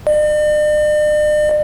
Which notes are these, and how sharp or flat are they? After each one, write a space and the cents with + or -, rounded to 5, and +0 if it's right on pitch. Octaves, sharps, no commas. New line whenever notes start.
D5 +45